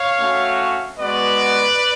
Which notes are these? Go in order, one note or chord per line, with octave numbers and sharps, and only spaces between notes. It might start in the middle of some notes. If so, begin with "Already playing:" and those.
Already playing: C#5 F5
A3 C#4 F#4
G#3 B3 F#4 B4 D5